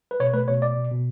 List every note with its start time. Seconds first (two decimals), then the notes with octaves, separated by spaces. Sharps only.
0.11 B4
0.20 B2 C#5
0.34 A3 B4
0.48 B2 C#5
0.62 B2 D5
0.77 B2
0.91 B2